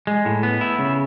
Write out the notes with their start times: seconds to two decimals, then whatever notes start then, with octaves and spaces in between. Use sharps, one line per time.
0.07 G#3
0.25 A2
0.43 B3
0.61 E4
0.79 C#3